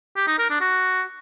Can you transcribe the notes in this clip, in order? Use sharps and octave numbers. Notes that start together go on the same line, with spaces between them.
G4
D#4
A#4
D4
F#4